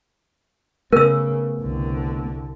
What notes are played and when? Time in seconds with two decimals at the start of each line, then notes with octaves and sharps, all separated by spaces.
0.92 C#3 A3 B3 A#4 E6
1.61 C2 D3